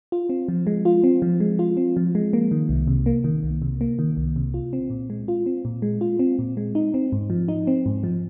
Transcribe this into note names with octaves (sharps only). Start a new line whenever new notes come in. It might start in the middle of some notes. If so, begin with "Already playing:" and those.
F4
C4
F3
G#3
F4
C4
F3
G#3
F4
C4
F3
G#3
A#3
D#3
C2
C3
A#3
D#3
C2
C3
A#3
D#3
C2
C3
F4
C4
A#2
G#3
F4
C4
A#2
G#3
F4
C4
A#2
G#3
D#4
C4
G#2
F3
D#4
C4
G#2
F3